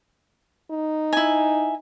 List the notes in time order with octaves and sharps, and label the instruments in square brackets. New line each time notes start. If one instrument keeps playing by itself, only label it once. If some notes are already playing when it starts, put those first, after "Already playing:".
[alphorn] D#4
[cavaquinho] E4 G#5